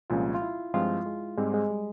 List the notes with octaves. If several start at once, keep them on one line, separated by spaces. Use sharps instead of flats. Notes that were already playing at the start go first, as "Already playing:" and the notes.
C2 A#2 F3 G#3 C#4 F4
F4
E4
G2 F3 G#3 C4 F4
G#3
G#2 G3 G#3 C4
G#3
G3